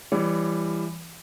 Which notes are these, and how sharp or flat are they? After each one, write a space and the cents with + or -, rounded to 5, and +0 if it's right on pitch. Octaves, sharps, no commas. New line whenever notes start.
E3 +20 G3 +20 C#5 +35